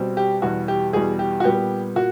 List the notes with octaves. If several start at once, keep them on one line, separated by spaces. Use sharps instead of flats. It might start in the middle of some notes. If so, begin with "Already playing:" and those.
Already playing: B2 G3 C4
G4
E2 B2 G3 F#4
G4
E2 B2 G3 G#4
G4
F#4
A#2 G3 B3 G4
A#2 F#4